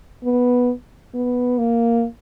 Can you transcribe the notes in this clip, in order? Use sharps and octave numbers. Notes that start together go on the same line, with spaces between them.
B3
B3
A#3